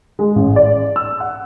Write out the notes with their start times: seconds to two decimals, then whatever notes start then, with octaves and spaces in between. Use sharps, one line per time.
0.19 G#3
0.36 A1
0.56 D5
0.96 E6
1.20 F#5